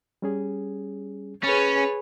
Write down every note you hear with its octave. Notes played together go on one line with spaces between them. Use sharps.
G3 C#4 G#4
C#4 G#4 B4 C#5 A6